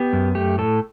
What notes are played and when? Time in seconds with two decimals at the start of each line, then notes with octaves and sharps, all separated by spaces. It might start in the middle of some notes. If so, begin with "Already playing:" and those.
Already playing: B3 G4
0.13 F#2
0.35 A3 G4
0.58 A2 A4